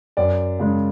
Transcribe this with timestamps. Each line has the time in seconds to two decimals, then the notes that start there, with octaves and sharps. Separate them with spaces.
0.17 F#2 D5
0.59 C#3 G#3